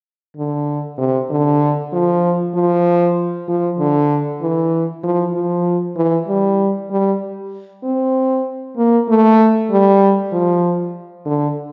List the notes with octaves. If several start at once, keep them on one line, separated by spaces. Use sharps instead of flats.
D3
C3
D3
F3
F3
F3
D3
E3
F3
F3
E3
G3
G3
C4
A#3
A3
G3
F3
D3